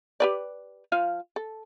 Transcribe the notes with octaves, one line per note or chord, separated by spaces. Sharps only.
G4 B4 D5
F3 F4 F5
A4